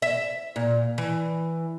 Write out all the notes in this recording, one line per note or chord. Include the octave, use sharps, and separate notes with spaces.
E5
A#2
E3